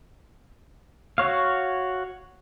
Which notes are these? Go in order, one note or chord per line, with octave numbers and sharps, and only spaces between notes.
F#4 C#5 F5